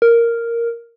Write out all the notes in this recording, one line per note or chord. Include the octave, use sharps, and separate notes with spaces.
A#4